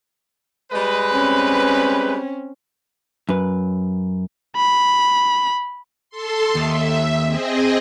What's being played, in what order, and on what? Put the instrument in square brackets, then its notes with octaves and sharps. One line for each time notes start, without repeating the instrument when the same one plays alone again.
[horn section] G3 G#3 B4 [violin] D#5
[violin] C4 C#4
[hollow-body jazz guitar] F#2 B4
[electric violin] B5
[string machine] A4 C6
[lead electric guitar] D#2 [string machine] E5
[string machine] C4 G#4 D#5